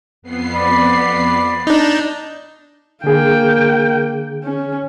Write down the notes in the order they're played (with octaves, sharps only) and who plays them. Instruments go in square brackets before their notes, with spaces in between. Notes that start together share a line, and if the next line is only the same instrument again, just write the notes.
[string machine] F2 B3 C7
[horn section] D5 B5
[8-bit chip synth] D4 D#4 [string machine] G6
[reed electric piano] D3 G#4 [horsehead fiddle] A#3 G5
[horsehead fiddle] C#4